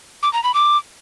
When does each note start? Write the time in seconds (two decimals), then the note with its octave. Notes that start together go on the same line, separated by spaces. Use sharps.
0.23 D6
0.33 A#5
0.44 B5
0.54 D6